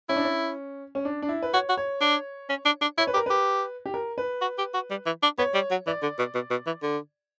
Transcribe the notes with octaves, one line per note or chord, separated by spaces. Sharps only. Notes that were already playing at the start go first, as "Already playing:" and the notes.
C#4 E4
D4
C#4
C#4
D4
D4
E4
B4
F#4 C#5
F#4
C#5
D4
C#4
D4
D4
E4 C#5
B4
G4 A#4
G4 B4
G4
A#4
B4
F#4
G4
F#4
G3
E3
D4
B3 C#5
G3
F#3
E3 D5
D3
B2
B2
B2
E3
D3